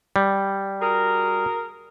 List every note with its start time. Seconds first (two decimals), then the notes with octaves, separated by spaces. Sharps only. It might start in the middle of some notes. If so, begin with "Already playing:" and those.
0.16 G3
0.81 F#4 G#4 A#4